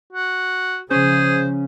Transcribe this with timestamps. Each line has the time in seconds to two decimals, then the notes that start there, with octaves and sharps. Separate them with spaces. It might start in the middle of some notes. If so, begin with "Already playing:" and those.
0.13 F#4
0.91 C#3 F3 C#4 G#4 C5